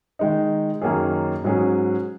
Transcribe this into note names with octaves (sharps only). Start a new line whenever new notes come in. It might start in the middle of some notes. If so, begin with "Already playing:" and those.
D#3 G#3 D#4
F#2 D#3 A#3 C#4 G#4
G#2 F#3 C#4 G#4